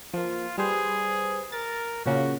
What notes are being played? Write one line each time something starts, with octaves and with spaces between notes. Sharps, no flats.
F3 A#3 F4
G3 G#4 B4 C5
A#4 A6
A#2 C#3 A#3 F#4